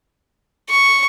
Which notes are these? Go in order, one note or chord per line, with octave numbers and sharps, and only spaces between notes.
C#6